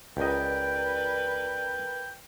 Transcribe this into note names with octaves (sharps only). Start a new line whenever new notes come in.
C#2 A#4 B4 D5 D#5 G5